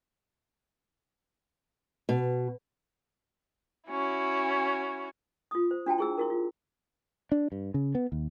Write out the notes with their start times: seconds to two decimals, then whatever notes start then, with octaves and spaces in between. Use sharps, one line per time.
2.09 B2
3.90 C#4 E4 F#4
5.51 F4 D#6
5.71 C5
5.86 D4 F#4 G5 A5
5.98 E4 G#4 E6
6.18 E4 F#4 A#4
6.30 F4
7.32 D4
7.52 G2
7.74 C#3
7.95 B3
8.12 D#2